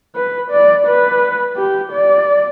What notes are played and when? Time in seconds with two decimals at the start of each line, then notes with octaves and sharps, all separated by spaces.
0.15 B4
0.51 D5
0.87 B4
1.56 G4
1.92 D5